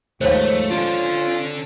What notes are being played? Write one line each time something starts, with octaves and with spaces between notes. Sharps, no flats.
D#2 G#2 F3 A3 C5 C#5 F5
C#4 D4 F4 A4